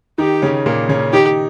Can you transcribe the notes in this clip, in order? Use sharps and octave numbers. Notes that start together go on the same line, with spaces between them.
D#3 D#4 G4
C#3 C#4
A#2 A#3
C#3 C#4
D#3 D#4 G4